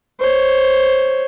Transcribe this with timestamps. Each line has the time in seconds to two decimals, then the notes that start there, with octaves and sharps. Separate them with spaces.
0.20 C5 C#5